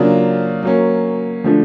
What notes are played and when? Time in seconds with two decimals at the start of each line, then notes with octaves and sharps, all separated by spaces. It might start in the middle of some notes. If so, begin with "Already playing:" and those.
Already playing: C#3 F#3 A#3 D4 F4
0.62 F#3 A#3 C#4
1.44 D3 F3 A3 D4